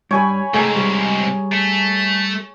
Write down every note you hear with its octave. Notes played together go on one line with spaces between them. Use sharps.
G2 G3 C#5 G#5 B5
G#2 C3 A3 G#4 A#5
G3
A3